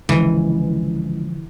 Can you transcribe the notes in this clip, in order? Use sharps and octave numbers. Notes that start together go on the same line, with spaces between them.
C#2 A#2 D3 E3 F3